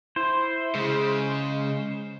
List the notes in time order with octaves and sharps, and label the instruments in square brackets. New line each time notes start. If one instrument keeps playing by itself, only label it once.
[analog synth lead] E4 [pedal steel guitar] C5
[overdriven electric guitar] C#3 [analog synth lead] G#3